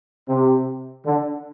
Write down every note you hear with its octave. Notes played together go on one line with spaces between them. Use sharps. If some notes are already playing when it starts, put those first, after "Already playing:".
C3
D3